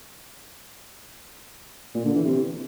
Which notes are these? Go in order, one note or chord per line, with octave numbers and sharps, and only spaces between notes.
A#2
D3
E3
C3